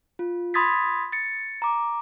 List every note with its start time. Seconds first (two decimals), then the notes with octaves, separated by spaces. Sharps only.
0.19 F4
0.54 B5 C6 D#6 G#6 A6 B6
1.12 A6 C#7
1.62 A#5 D6